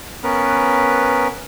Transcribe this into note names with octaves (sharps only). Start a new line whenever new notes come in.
B3 C#4 A#4 B4